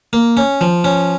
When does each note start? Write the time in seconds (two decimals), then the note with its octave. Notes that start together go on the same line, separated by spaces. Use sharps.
0.13 A#3
0.37 C#4
0.61 F3
0.84 C#4